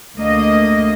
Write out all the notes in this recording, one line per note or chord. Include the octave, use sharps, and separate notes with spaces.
D2 A#3 D#5